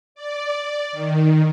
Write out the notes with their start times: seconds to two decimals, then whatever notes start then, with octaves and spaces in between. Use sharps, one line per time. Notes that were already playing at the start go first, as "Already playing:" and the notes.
0.15 D5
0.93 D#3